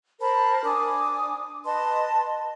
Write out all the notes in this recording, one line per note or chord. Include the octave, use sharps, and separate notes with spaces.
A#4 C5 A5 B5
D4 G#5 D6 D#6
B4 D#5 A5 C6